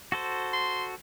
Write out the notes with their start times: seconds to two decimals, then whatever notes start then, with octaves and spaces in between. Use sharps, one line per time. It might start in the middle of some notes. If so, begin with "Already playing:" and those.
0.12 F#4 A4 C5
0.53 C6